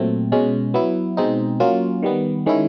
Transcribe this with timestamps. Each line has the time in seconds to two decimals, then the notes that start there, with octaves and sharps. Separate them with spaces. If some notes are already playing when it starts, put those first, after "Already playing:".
Already playing: A#2 F#3 A3 C4
0.32 B2 G#3 C#4
0.74 F#3 B3 E4
1.17 B2 G#3 C4 D#4
1.60 F#3 A#3 C#4 F4
2.03 D#3 G3 B3
2.46 D#3 G#3 C#4 E4